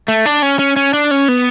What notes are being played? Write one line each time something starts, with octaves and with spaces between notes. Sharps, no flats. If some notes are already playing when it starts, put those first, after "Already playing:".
A3
D4
C#4
C#4
C#4
D4
C#4
B3